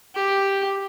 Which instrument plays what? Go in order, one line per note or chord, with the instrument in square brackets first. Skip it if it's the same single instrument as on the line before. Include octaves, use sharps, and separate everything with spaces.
[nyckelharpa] G4